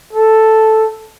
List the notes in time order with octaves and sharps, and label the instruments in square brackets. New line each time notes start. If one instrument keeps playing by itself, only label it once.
[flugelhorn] A4